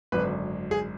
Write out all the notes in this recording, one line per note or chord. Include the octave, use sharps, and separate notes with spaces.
G#1 F#2 D3 B4
G#4